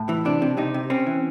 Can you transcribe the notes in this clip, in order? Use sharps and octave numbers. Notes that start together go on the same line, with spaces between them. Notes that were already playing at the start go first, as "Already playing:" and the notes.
Already playing: A2
E3
C3 D4
C3
C3 D#4
C3
C4 C#4
E3